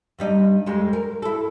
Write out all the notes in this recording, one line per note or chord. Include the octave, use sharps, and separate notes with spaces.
G2 G3 D#4
F2 G3 G#3
A#4
E4 A4